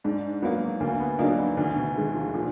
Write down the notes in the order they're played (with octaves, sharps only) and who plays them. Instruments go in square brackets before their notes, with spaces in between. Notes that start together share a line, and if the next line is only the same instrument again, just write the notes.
[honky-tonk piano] G#2 [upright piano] D4
[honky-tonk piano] F#3 A#3 [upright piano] B3
[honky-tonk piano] D2 [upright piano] A#3
[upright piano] B3
[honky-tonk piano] D3 F#3 A#3 D#4 [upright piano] D4
[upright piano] B3
[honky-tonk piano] D2 [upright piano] D#3
[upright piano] B2
[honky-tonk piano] D3 G#3 [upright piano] D#3
[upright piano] F3
[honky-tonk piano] A#2 [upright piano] D3